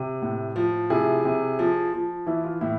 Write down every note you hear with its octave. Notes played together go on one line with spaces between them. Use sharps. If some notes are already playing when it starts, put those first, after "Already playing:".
Already playing: C3
A2
F3
C3 E4 G#4
C3
F3
F3
E3 E4
F4
A2 E4